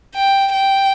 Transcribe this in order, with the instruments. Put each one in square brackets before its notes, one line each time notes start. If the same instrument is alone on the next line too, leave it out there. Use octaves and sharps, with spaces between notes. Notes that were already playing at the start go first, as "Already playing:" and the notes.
[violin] G5
G5